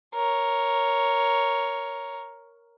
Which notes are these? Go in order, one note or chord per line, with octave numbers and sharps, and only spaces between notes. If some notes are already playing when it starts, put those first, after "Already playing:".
A#4 C#5